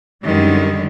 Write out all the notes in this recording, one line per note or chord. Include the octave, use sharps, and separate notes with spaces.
F#2 D3 D#3 G3 G#3